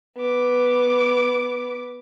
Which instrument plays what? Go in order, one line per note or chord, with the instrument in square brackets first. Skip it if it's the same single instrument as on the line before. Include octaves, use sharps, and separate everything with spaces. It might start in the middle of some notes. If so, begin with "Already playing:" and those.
[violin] B3 D6